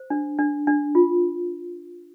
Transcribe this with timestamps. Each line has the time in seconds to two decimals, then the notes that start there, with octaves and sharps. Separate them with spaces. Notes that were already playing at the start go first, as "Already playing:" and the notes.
Already playing: C5
0.10 D4
0.39 D4
0.67 D4
0.95 F4